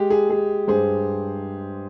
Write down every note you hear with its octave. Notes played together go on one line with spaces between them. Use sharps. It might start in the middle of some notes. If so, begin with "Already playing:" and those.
Already playing: G#3 G4
G#4
G#3 G#4
G2 G#4 C5